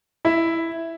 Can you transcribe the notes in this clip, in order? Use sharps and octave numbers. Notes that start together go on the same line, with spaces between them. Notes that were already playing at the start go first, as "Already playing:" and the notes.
E4 E5